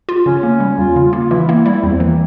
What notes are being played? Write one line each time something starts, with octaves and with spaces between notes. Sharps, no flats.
F4
C#3 C#4
A#3
G3
E2 F4
C#3
F4
A#3
E3 E4
A#3 E4
G3 E4
E2 C4
E3 A#3